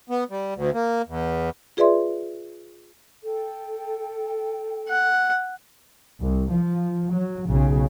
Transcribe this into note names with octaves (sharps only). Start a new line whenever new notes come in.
B3
G3
D2
A#3
E2
F4 G#4 B4 D5 E5 C6
A4 G5
F#5
C2
F3
F#3
B1 C#3